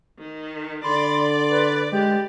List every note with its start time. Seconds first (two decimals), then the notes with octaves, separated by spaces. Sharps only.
0.18 D#3
0.84 D3 D5 B5 C6
1.50 B4
1.92 G#3 G4